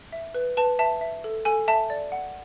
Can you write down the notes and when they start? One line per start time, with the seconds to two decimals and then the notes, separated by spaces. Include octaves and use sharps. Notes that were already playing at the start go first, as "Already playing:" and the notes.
0.12 E5
0.35 B4
0.57 B4 A5
0.79 E5 A5
1.01 E5
1.24 A4
1.45 A4 G#5
1.68 E5 A5
1.90 D5
2.12 F#5